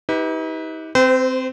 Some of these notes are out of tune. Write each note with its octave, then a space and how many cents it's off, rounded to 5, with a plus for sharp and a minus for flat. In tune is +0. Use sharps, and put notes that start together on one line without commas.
D#4 +45 G4 +0 B4 +0
C4 -5 C5 -35 G5 +0